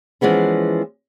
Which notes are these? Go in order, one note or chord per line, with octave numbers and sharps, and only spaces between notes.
E3 F3 G#3 B3 C#4